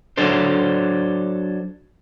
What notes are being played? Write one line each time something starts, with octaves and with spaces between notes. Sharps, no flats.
F#3 D4 A4 C5